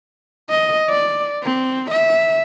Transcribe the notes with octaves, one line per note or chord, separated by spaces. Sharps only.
D#5
D5
C4
E5